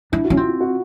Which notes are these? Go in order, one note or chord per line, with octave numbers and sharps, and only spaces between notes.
D4 E4
F#4
C#4
C4 F4
F4
F#4